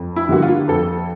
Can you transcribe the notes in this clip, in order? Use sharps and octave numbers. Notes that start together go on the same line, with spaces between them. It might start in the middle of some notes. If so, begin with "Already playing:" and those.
Already playing: F2
E4
D3 G3 A#3 F#4
F4
F2 A4